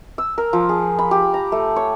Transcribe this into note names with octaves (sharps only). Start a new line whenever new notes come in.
E6
A#4
F3
G#4
B5
G4
A#5
A3
C#5